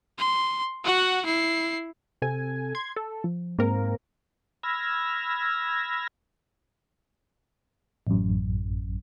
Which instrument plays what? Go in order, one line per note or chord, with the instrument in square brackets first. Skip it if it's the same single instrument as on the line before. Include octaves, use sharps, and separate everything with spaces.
[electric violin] C6
F#4 F#5
E4 C7
[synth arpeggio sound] C3 A4 G#5
C6 G#6
A4
F3
[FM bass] G#2 [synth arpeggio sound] A#3 C4 A#4
[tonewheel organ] B5 E6 F6 G#6 A#6
[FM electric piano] A1 F#2